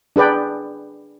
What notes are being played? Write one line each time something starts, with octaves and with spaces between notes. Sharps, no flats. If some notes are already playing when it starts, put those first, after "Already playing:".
D4 G#4 B4 D5 G5